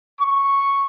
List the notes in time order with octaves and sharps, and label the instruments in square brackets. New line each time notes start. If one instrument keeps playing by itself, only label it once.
[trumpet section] C#6